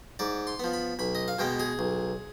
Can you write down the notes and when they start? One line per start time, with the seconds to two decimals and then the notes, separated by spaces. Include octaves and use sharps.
0.19 G#2 D5
0.47 C6
0.60 F3 B3
0.73 B5
0.99 B1 B5
1.15 D#5
1.28 F5
1.39 B2 G#3 B3 G5
1.60 G#4
1.79 B1